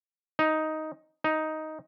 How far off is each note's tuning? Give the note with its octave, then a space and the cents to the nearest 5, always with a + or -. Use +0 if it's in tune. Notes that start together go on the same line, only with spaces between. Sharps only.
D#4 +5
D#4 +5